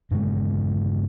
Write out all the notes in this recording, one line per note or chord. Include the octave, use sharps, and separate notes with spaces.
G2 A#2 C#3 G#3